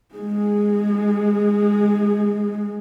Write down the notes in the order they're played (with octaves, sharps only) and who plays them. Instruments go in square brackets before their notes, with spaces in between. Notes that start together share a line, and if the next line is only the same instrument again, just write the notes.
[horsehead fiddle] G#3 G#4